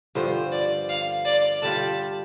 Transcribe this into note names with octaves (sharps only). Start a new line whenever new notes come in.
G2 D3 F3 C5
D5
F5
D5
D3 G3 F4 A5